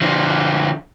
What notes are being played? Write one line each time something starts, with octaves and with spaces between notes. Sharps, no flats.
D3 F3